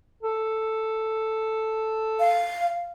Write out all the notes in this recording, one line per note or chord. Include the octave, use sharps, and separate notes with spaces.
A4
F5